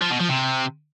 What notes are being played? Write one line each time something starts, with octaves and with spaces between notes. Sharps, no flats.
F3
B2
F3
C3